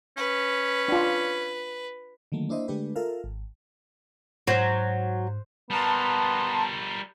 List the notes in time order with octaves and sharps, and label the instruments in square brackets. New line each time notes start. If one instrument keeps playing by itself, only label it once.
[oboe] C#4 [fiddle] B4
[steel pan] D4 F4
[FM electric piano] D3 D#3 F#3 A3 A#3
A#3 D4 E4 C5 D#5
D3 G#3 A3 D4 G4 B4
F4 A4 A#4 E5 F5
G#1
[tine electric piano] G#2 [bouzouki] F#3 [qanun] C5
[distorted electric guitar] G3 A#4 [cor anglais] B3 [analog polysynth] A5 A#5 C6